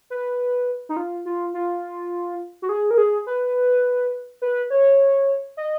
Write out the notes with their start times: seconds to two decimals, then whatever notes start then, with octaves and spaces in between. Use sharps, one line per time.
0.10 B4
0.89 D#4
0.97 F4
1.25 F4
1.54 F4
2.62 F#4
2.69 G#4
2.91 A#4
2.98 G#4
3.27 B4
4.42 B4
4.70 C#5
5.57 D#5